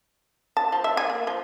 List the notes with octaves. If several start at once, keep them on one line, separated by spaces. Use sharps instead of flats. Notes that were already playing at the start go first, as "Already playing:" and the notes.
A5
F3
E5
G#5
A#3
F3